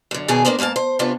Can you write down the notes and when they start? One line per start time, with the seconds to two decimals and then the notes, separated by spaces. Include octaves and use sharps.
0.11 F#2 D3
0.28 B2 D#3 C#4 D4 G#4
0.45 A#3 B3 C#4 D4 C5
0.59 G#2 A#3 F#4 F5 A5
0.76 C5
0.99 C3 B3 C#4 D4 F4